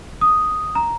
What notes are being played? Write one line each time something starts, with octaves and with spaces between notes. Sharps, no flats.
D#6
A#5